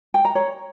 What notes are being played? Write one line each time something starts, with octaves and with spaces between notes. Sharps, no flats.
G5
A#5
C#5